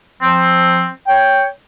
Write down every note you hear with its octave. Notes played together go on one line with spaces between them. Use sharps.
F3 C4
C#5 G5